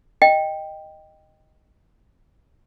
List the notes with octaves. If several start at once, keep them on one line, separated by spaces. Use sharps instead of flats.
D#5 G5